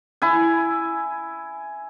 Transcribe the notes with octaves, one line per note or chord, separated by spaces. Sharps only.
E4 G#5